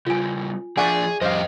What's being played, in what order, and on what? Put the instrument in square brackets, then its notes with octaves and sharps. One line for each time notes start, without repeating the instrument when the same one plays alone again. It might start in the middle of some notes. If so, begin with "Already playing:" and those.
[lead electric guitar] C#3 G3 [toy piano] F4 G#5
[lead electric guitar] F3 D4 [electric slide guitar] G#4 [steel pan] D5 E5 F#5 [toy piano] G#5 C#6
[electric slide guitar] F2 G3 [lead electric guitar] A#4 D#5 [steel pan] C5 F5